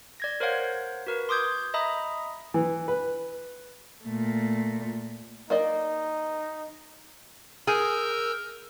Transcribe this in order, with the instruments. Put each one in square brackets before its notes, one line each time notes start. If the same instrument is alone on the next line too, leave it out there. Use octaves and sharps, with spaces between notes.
[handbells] D5 G#6 A#6
A#4 C5 C#5 F5 F#5
F#4 A#4 B4
C6 D6 D#6 G6 G#6
D#5 E5 A#5 B5 D#6
[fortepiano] E3
B4
[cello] A#2 A3
[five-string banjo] A#3 D5 D#5 [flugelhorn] D#4
[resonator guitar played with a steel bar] G#4 [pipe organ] A#4 E6 G6